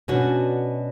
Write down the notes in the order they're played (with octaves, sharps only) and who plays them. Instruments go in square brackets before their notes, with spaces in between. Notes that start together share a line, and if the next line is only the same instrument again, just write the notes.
[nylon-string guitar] B2 B3 C#4 D4 F#4